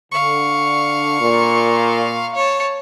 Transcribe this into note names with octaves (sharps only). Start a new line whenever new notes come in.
D3 F5 C#6
A#2
C#5 A5